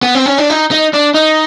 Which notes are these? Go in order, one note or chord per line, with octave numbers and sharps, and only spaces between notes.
B3
C4
C#4
D4
D#4
D#4
D4
D#4